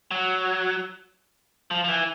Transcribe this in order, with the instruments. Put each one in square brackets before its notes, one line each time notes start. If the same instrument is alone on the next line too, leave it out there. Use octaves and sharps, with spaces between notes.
[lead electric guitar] F#3
F3
F3
E3